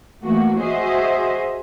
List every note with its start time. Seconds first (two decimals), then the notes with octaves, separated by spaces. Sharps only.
0.22 E3 A3 A#3 F#4
0.60 F#4 G#4 C5 D#5 E5